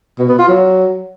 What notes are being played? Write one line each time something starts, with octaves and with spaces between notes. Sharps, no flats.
B2
B3
F4
F#3